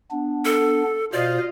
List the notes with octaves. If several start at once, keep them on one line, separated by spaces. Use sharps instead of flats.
B3 D4
A4
B2 F4 C5 D5 D#5 F5